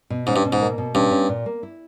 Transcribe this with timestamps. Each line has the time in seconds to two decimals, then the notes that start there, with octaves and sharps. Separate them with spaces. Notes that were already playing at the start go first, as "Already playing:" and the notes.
0.10 B2
0.27 G#2 C#4
0.36 G2
0.45 B2
0.53 G#2
0.61 A#3
0.78 B2
0.95 G2 C#4
1.11 C#4
1.29 A#2
1.46 A#3
1.63 E4